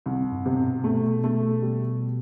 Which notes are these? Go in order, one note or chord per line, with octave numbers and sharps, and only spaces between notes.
C2
G2
C3
B2
A3
A3
G3